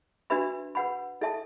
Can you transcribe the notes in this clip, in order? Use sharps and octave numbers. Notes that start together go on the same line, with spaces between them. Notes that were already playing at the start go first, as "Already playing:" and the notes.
D4 F#4 B4 E5 B5
B4 F#5 B5
E4 A4 E5 A5